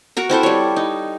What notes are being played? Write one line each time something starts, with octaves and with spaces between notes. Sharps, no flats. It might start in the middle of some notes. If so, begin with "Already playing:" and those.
F#4 A#4 A#5
C4 E4 A4 C5
G3 C#5
D#4